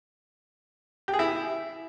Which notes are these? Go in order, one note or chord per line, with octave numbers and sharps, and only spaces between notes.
G4
G#4
E4